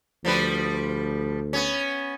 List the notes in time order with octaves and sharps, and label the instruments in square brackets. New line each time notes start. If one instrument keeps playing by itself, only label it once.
[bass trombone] D2 [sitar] F3 G3 B4
[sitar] B3 C#4